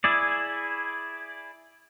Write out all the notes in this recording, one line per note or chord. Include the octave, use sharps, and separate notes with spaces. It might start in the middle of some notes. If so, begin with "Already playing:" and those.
E4 G#4 D5